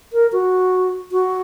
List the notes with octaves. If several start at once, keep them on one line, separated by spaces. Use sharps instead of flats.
A#4
F#4
F#4